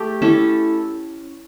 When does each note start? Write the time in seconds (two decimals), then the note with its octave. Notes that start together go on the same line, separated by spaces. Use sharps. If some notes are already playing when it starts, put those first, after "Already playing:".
Already playing: A3 G4
0.22 C#4 E4 A4